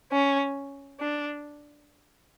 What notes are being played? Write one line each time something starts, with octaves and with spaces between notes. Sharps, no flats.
C#4
D4